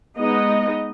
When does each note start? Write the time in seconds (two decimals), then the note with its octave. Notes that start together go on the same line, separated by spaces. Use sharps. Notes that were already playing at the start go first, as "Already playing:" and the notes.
0.18 G#3 B3 D#4 D#5